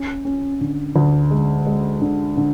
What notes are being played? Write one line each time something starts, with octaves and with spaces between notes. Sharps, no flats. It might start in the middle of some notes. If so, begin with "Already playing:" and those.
Already playing: C#4
C#4
D3
D2
G#3
G#3
D3
D3